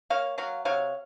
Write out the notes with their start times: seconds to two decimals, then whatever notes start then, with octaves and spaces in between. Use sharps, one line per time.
0.10 A#3 C#5 F5
0.38 F#3 C#5 F5
0.65 C3 C#5 F5